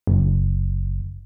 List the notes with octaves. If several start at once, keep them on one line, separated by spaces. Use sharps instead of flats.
F#1